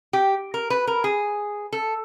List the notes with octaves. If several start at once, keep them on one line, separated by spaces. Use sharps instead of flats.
G4
A#4
B4
A#4
G#4
A4